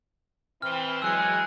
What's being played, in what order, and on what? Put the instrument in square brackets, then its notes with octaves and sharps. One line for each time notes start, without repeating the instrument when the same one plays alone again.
[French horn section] E3 C4 [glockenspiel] F6 G7
[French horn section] E3 G#3 [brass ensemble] F#3 G#5 [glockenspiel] E6 F#6 C#7